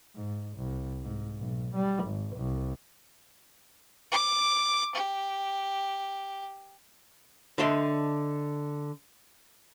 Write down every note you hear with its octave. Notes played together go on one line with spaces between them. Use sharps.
G#2
C2
G#2
B1
G3
G#1
C2
D6
G4
D3 D4 D#5 E5 C6